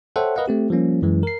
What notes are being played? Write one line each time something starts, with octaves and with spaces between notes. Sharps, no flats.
A4 C5 C#5 E5 F#5 G5
A#4 B4 D#5 F5 F#5
A3 C4 G4
F3 G3 A#3 C#4
F#2 E3 G#3
A#4 C7